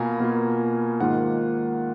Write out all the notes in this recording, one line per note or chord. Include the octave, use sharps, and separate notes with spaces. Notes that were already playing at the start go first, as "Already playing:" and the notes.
Already playing: B2 A#3 F4 F5 G#5 A#5 B5
B2 A#3 F4
G#2 D#3 A#3 F4 F#5